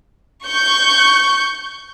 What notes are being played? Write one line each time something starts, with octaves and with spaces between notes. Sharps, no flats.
C#6 G6